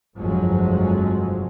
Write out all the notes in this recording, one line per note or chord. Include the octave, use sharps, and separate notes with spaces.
G1 F2 C3 F3 F#3 G#3